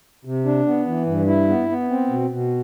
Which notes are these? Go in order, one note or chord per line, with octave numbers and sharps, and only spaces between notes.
C3
D4
B3
E3
G2
E4
B3
B3
C4
B2
B2